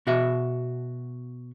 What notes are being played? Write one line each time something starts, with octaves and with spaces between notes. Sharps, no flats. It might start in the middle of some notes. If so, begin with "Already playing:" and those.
B2 F#4 E5